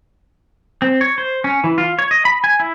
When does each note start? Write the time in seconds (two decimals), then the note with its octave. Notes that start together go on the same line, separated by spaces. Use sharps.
0.82 C4
1.01 C#5
1.18 C5
1.44 C#4
1.64 E3
1.78 F4
1.99 C#5
2.11 D#5
2.25 B5
2.44 G#5
2.60 E4